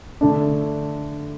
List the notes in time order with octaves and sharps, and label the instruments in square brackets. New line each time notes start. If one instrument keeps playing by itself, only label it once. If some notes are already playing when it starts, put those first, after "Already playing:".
[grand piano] D3 A3 D4